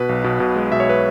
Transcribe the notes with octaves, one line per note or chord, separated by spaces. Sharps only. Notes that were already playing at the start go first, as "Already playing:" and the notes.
Already playing: B2 B4
B1
B2
B2
G#3
B2 E5
C#5
B4